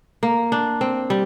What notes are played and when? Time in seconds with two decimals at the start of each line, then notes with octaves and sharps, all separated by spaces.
0.23 A#3
0.52 D4
0.81 C4
1.10 G3